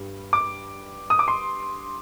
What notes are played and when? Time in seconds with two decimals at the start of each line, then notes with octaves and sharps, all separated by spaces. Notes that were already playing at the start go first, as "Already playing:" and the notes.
Already playing: G2 G3
0.33 D6
1.10 D#6
1.19 D6
1.28 C6